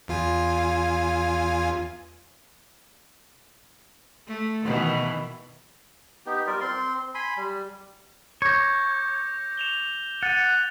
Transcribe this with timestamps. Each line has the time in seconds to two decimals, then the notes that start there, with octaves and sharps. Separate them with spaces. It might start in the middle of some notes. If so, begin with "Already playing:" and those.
0.08 E2 F4 G#5
4.28 A3
4.64 B2 D#3 E3
6.26 B3 D#4 G4
6.47 G3 F4 A#4 D5
6.61 C4 C6
7.14 G#5 B5 C6
7.37 G3
8.42 C#5 D6 G6 A#6
9.57 E7 F7 G7
10.23 F#5 A6 D#7